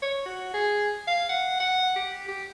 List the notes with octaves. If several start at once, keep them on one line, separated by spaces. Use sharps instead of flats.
C#5
F#4
G#4
F5
F#5
F#5
G4
G4